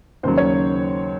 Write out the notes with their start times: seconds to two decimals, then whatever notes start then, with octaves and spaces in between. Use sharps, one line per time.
0.23 D#2 C#3 F#3 C5
0.38 C#5